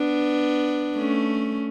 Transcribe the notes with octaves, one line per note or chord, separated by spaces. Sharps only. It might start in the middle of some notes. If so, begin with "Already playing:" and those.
Already playing: B3 D4
A3 C#4